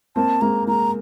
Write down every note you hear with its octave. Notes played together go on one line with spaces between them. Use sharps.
A#3 C4 A5
G#3 A#3 A#5
G#3 A#3 A#5